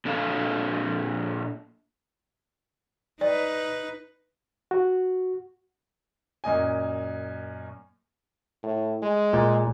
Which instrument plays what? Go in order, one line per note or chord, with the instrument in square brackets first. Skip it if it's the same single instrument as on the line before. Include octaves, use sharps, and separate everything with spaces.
[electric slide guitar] A#2 D4 A4 F5
[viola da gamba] D#4 B4 [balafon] D5
[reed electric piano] F#4
[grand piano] F#2 A#2 D#5 G#5
[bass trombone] A2
G#3
[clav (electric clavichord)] A#2